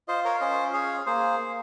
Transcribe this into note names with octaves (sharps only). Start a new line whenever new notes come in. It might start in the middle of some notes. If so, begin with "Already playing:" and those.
F4 C5 D#5
A#4 C#5
F5
C#4 C5 D#5
G#4 C#5 F5
A#3 G#4 C5
A#3